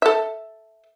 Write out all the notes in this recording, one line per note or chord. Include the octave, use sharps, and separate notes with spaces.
A4 E5